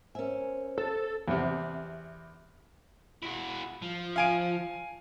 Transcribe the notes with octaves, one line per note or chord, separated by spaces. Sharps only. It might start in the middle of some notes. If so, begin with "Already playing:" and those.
C#4 A#4 C5 E5 G#5
A4
E2 C3
E4 F#4
F3
F5 G#5 D7